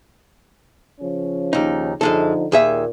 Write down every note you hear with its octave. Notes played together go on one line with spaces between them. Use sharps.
C#3 F3 C#4
D#2 D#4
F#2 D3 F3 G#3 D#4 A4
D#2 A#2 G#4 E5